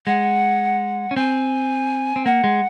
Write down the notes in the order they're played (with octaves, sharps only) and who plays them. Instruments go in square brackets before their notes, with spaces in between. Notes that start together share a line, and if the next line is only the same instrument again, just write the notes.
[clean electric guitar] G#3 [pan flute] F#5
[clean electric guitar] C#4
[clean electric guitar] C4 [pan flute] G#5
[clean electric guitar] C4
[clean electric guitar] A#3 [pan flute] F#5
[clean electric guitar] G#3